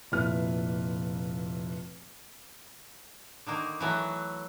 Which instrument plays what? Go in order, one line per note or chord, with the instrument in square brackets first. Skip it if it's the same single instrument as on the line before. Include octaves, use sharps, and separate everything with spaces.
[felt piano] F1 A#2 E4 B4 F6
[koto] D3 D#3 A#3
E3 F#3 A3